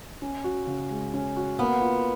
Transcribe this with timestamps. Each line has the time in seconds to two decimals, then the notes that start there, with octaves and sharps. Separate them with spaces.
0.22 C#4
0.44 F#4
0.67 C#3
0.90 G#3
1.14 C#4
1.37 F#4
1.59 A#3 B3
1.81 F4